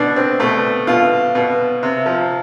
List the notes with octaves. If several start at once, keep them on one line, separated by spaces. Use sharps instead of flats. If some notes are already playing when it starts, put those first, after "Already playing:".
Already playing: B2 D4
C4
B2 A3
B2 F4
B2
C3
F3